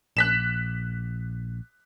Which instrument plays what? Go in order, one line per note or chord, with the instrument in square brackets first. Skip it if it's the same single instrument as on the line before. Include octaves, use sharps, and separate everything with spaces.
[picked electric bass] A#1 [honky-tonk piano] F#6 B6 E7